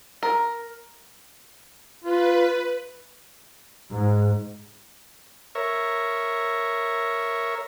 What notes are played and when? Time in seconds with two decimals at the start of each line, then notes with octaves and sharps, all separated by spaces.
0.23 A#4
2.04 F4 B4
3.93 G#2
5.55 A#4 C#5 E5